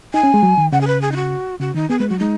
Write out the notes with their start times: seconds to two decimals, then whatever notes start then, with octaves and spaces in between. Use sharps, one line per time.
0.14 D#4 G#5
0.23 C#4
0.34 G#3
0.43 F#3
0.58 D#3
0.72 C#3 F#5
0.81 G#4
0.87 B4
1.01 G#4
1.12 D#4
1.16 F#4
1.60 C#3 F#4
1.74 D#3 D#4
1.89 B3 G#4
1.99 G#3 B4
2.09 F#3 F#4
2.19 G#3 D#4